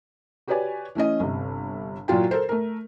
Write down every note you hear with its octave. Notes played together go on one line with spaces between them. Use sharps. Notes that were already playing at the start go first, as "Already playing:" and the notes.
F#4 G4 B4 C#5 D5 G#5
E3 A3 C#4 D#5
G1 C3
A#2 E3 F#3 F4 G5
A4 A#4 C5
A3 A#4